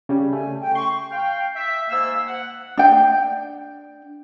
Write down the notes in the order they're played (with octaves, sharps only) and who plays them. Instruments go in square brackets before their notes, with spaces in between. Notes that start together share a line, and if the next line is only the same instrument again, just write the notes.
[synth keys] C#3 G3
[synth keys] A3 [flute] G#5
[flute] G5
[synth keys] C6 [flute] C#6
[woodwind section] F5 G5
E5
G#2 A#3 F5 E6
F#5
[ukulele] D4 G5